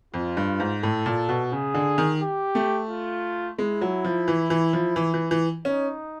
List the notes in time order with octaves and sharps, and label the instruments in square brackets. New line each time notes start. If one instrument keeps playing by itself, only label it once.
[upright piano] F2 [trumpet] F4
[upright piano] G2
G#2
[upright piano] A2 [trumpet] A4
[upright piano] A#2
B2
[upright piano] C#3 [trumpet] G#4
[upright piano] D3
D#3
[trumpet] G4
[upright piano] A3
[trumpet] F4
[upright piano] G#3 [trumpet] E4
[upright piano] F#3
F3
E3
E3
F3
E3
E3
E3
[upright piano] C#4 [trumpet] D#4